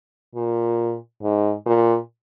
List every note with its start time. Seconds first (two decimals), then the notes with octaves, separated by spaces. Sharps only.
0.35 A#2
1.22 G#2
1.66 A#2